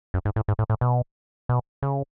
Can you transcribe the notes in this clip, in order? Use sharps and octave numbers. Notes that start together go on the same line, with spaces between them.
F#2
G#2
A2
G#2
A2
A2
B2
B2
C#3